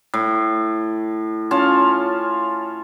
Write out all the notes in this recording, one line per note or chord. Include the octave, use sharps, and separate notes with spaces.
A2
C#4 F4 F5 A5